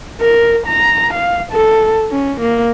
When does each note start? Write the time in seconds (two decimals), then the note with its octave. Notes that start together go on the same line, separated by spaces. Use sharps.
0.21 A#4
0.67 A#5
1.14 F5
1.52 A4
2.11 C#4
2.41 A#3